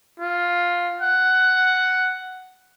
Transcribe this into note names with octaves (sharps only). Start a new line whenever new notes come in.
F4
F#5